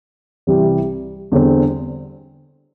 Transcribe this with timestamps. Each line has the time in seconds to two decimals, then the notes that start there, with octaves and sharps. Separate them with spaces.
0.47 C2 C3 E3 G3
1.32 E2 D3 G3 C4